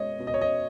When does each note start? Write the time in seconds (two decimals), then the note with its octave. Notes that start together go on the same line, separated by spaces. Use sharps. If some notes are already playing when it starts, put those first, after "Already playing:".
Already playing: B2 G#3 C#5 D#5
0.19 B2
0.27 D#5
0.34 C#5
0.41 D#5